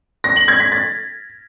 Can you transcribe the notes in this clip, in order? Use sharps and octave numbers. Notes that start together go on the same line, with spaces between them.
A#6
F#7
G#6
B6
A6